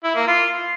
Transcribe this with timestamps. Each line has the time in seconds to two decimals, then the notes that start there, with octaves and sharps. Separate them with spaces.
0.04 E4
0.16 A#3
0.27 F4